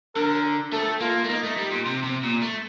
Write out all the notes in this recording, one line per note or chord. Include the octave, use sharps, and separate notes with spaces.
D3 A#4
A3 A4
A#3 F4
A3
A#3 D#4
A3
G3
A#2
C3
C3
A#2
A3